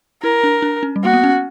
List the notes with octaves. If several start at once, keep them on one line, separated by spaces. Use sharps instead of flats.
E4 A#4
D4
D4
C#4
G3
A#3 F#4
B3
C#4